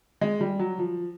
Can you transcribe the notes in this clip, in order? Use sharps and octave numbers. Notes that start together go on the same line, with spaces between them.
G#3
G3
F#3
F3